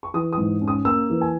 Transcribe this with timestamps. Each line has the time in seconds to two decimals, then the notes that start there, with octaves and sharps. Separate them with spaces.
0.03 C#6
0.14 E3 D#6
0.33 D#6
0.38 G#2
0.61 C#4
0.68 D#6
0.85 A#3 E6
1.10 E3
1.21 G#5